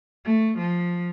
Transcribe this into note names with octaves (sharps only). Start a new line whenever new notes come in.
A3
F3